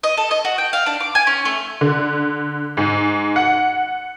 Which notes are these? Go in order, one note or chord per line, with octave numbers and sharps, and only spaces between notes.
D#5
A4
D#5
F#4
G5
F5
D4
D6
G#5
C#4
A3
D3
G#2
F#5